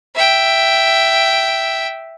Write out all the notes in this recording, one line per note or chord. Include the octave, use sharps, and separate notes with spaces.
E5 G5